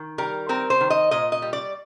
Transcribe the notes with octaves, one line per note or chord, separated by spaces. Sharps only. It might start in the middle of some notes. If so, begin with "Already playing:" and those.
Already playing: D#3
G3 A#4
C4 A#4
C5
D#3
D#5
A#2 D#5
D#5
G3
D5